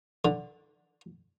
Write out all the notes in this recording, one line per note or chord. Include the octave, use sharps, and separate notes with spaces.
D3